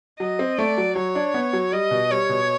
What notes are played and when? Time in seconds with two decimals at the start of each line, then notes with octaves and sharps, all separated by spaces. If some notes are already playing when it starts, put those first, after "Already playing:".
0.20 F#3 D#5
0.39 C4
0.58 A3 D5
0.78 F#3
0.96 F#3 C#5
1.15 D4
1.34 B3
1.53 F#3
1.72 G3 D#5
1.91 B2
2.10 G3 C#5
2.29 B2